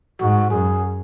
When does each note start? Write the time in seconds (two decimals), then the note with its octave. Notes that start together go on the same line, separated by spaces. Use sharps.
0.20 G#2 F#4
0.50 F#2 G#4